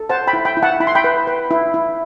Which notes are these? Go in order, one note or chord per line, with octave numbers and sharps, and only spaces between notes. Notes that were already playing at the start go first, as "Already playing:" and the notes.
Already playing: A4
C5 F#5 A5
G5 B5
E4
G5 B5
E4
F#5 A5
E4 B5
C6
G5 B5
B4
B4
E4
E4